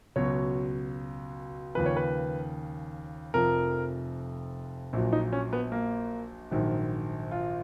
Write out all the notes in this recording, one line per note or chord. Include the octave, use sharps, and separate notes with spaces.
C#2 B2 F#3 C#5
D#2 C#3 F3 B4
C#5
B4
F1 F2 F3 A#4
A#1 A#2 F#3
D#4
C#4
B3
A#3
A#1 G#2 D#3 F#3
F4